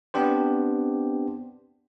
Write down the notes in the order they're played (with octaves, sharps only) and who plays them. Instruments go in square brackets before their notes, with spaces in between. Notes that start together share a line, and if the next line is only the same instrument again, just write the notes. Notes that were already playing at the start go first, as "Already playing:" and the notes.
[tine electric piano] B3 C4 D4 G4 C5